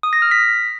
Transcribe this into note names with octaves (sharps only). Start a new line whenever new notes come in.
D#6
A#6
F6
B6